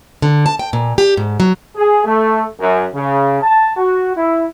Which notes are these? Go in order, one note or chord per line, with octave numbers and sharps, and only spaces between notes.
D3
A5
G5
A#2
G4
G#2
F#3
G#4
A3
F#2
C#3
A5
F#4
E4